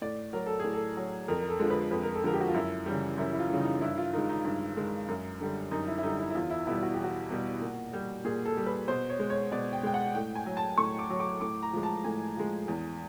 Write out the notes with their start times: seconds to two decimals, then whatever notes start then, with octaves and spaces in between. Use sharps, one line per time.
0.02 A2 D5
0.33 F#3 A#4
0.46 A4
0.60 A2 G#4
0.73 A4
0.97 F#3
1.28 F2 A#4
1.41 A#4
1.49 A4
1.59 D3 F3 G#3
1.70 B4
1.91 F2 B4
2.03 A#4
2.15 A4
2.23 D3 F3 G#3 A#4
2.33 G4
2.41 F#4
2.48 F4
2.54 F#2 E4
2.86 C#3 E3 G3
3.18 F#2 E4
3.33 E4
3.39 F4
3.50 C#3 E3 G3
3.60 D#4
3.81 G2 E4
3.98 F4
4.13 D#3 G#3 D#4
4.29 D#4
4.45 G2
4.76 D#3 G#3
5.08 F#2
5.40 D3 G3
5.71 F#2 D#4
5.88 E4
5.98 E4
6.03 D3 G3 D#4
6.19 E4
6.30 E4
6.35 E2 F4
6.50 E4
6.67 B2 G3 E4
6.83 F#4
6.94 E2 G4
7.04 F#4
7.30 B2 G3
7.61 A#2
7.93 G3
8.24 A#2 G#4
8.45 A4
8.57 G3
8.66 B4
8.88 B2 C5
9.10 C#5
9.19 G#3
9.30 C#5
9.51 B2 D5
9.73 G5
9.83 G#3 G5
9.94 F#5
10.15 A2 G5
10.35 G#5
10.46 F#3
10.57 A5
10.78 A2 C#6
10.99 D6
11.10 F#3
11.20 D6
11.41 A2 D6
11.63 A#5
11.73 F3 G#3
11.83 A5
12.04 A2 G#5
12.37 F3 G#3
12.68 E2